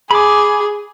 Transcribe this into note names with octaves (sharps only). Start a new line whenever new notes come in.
G#4 B5 D6